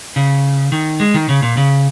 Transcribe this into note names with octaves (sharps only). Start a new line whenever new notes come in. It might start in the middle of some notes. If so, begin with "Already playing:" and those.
C#3
D#3
G#3
D#3
C#3
A#2
C#3